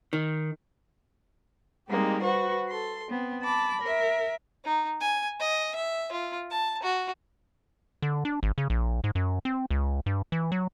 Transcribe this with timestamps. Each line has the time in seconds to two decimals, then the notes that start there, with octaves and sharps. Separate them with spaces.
0.13 D#3
1.89 G3 G#3 A#3 C4 D#4 G4
2.22 F#4 B4 C5 F#5 C#6
2.68 A4 C6
3.09 B3 C4
3.41 A5 B5 D6
3.81 A#4 E5
4.65 D#4
5.01 G#5
5.40 D#5
5.75 E5
6.12 F4
6.50 A5
6.83 F#4
8.02 D3
8.25 D4
8.43 G#1
8.58 C#3
8.70 A#1
9.04 G#2
9.15 F#2
9.45 C4
9.70 C#2
10.06 G2
10.32 E3
10.52 F#3